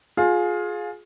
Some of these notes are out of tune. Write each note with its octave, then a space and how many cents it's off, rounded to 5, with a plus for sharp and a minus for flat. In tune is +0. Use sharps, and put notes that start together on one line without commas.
F4 +25 G#4 +15